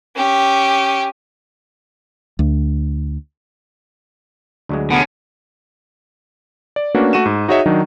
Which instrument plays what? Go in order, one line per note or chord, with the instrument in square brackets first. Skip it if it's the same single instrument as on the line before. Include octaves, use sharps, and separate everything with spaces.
[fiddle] C#4 G4
[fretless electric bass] D2
[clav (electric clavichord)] D2 F#3 G#3
[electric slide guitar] D3 C#4 [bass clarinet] B3
[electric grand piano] D5
A3 A#3 C#4 D4 F#4 B4
A3 F#4 D#7 E7
G#2
D#4 F#4 G#4 C#5 D#5 E5
D#3 F#3 D4 D#4